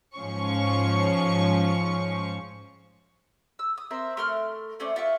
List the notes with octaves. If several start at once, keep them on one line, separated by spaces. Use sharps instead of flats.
G#2 F3 C#4 C#6
E6
D#6
C4 A#4 C5 E5
A3 A#4 C6 F6
A3 C#4 C5 D5
F4 E5 G5 C#6